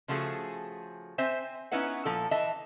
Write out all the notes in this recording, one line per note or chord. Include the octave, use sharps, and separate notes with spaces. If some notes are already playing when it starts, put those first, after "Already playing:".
C#3 F3 A3 F#4 G#4
C4 C5 E5 G#5
B3 C#4 D#4 E4 B4 F#5
A#2 F3 A4
E3 D#5 E5 A5